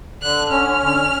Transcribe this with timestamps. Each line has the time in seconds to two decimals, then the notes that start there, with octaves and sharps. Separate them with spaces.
0.22 D3 F#6
0.51 C#4 F6
0.80 D3